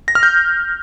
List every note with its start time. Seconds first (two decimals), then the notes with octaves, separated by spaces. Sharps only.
0.08 A#6
0.15 F6
0.23 G6